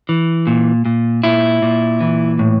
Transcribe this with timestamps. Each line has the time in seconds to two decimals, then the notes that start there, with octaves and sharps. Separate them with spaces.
0.09 E3
0.47 A#2
0.85 A#2
1.24 A#2 E4
1.62 A#2
2.01 E3
2.39 A2